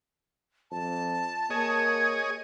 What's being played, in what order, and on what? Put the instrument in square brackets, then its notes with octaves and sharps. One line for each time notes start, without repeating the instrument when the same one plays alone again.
[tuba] F2 [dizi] A5
[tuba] A#3 [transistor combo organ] G#4 C#5 D#5 [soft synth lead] G#6